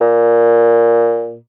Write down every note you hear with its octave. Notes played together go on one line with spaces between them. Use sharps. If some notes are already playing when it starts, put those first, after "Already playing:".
A#2